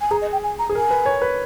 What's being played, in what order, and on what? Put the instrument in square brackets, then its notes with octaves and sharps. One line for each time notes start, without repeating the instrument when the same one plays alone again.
[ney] G#5
[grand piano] G#4 [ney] A#5
[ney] D#5
G5
G#5
A#5
[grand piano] G#4
[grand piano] A#4 [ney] G#5
[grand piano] B4
C#5
B4